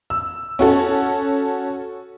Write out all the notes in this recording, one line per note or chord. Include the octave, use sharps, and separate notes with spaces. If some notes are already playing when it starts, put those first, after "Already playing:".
E6
C#4 F#4 A4